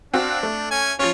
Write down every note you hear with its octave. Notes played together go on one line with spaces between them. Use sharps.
C4 D4 F#4 F5
A3
C#4 G#5
F3 C#4 F4 C#5